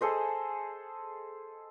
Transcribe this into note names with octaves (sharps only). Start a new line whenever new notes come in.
G#4 A4 C5 D#5